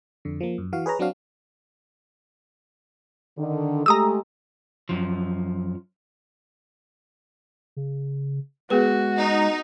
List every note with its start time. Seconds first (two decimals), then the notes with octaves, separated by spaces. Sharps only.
0.25 F2 D3
0.41 F3 A#3
0.58 F#2
0.73 E3 F#4 F5
0.86 G#4 B4 C#5 A#5
0.99 F#3 C4 D4 F#4 F5
3.37 D3 D#3
3.86 G#3 A3 G4 A#5 D#6 E6
4.89 F#2 F3
7.77 C#3
8.70 G#3 B3 F#4 G#4 B4
9.18 D#4